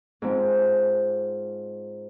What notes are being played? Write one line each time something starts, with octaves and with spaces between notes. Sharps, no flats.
G#2 F3 C4